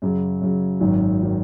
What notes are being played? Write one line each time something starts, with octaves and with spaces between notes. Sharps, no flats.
F#2 C#3 F#3
F#2 C#3 F#3
G#1 F#2 D#3 F#3
D#3 F#3